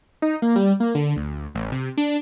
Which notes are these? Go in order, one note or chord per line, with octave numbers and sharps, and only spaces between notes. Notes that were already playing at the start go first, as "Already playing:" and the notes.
D#4
A#3
G3
A#3
D3
D2
A1
C3
D4